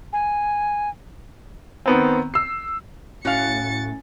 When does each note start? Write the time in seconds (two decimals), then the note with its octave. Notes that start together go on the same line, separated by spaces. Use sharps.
0.13 G#5
1.86 D#3 B3 C4
2.34 E6 C7
3.25 A2 C#4 E4 F#4 F5 G#5 A6 C#7